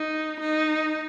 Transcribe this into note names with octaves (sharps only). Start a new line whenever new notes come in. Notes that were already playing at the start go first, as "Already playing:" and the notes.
Already playing: D#4
D#4